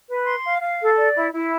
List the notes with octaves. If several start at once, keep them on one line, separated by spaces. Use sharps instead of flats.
B4
C6
F5
F5
A4
D5
E4
E4